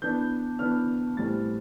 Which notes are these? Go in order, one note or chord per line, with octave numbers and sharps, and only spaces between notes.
E3 B3 D4 G6
E3 B3 D4 F6
A2 E3 G3 C4 A6